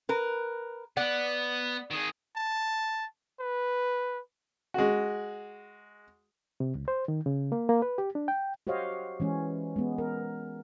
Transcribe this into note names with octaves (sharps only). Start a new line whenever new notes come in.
A#4 B4
B3 D5 F#5
D#3 G#4
A5
B4
G#3 F#4
C3
C#2
C5
D#3
C#3
A#3
A#3
B4
G4
D4
G5
F#4 G4 C5 C#5 D#5 F5
E3 G#3 C#4
G#3 B3
A#4